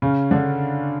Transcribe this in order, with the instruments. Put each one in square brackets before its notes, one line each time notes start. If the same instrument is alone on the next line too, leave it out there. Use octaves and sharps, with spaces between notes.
[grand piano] C#3 C#4
D3 D4